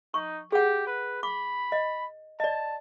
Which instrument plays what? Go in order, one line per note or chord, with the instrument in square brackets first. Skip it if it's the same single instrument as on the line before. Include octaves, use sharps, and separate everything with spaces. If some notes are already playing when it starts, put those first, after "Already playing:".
[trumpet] D#4 [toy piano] C#6
[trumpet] G4 [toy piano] G#4 F#5
[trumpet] B4
[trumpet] B5 [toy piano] D6
[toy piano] D#5
[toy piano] D5 D#5 [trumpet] A5